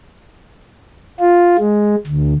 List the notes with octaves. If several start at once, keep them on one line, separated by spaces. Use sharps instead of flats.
F4
G#3
D2